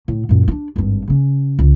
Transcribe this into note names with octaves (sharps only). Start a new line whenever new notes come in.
A2
F#2 A#2
D4 D#4
G#1 G2
C#3 C#4
C#2